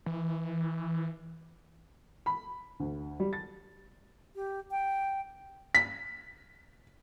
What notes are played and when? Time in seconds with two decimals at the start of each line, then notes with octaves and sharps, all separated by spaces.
0.06 E3
2.26 B5
2.80 D2
3.20 G3
3.33 A6
4.35 G4
4.71 G5
5.75 B6